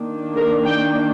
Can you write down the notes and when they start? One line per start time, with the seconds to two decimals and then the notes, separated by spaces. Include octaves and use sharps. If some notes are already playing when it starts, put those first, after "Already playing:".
Already playing: D#3 A#3 D4
0.36 A#4
0.66 G5